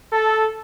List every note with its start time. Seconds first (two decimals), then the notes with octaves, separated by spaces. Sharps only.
0.12 A4